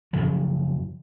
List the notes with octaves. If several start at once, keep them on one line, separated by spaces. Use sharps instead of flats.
F#2 C#3 F3 F#3